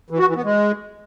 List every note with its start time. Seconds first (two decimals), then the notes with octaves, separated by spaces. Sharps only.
0.10 E3
0.19 F#4
0.27 E3
0.36 B3
0.44 G#3